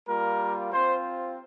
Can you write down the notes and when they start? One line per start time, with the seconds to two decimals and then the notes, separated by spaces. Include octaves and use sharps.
0.08 G3 A#3 F4 A#4
0.73 C4 F4 C5